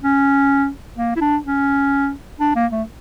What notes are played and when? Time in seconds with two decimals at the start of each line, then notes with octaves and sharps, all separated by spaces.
0.03 C#4
0.98 A#3
1.16 E4
1.21 D4
1.46 C#4
2.40 D4
2.55 A#3
2.72 A3